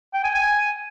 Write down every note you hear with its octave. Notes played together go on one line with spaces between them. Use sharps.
G5
G#5
G#5